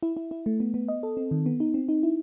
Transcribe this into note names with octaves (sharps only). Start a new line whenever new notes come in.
E4
E4
E4
A3
B3
B3
D#5
A4
C4
D#3
B3
D#4
C4
D#4
E4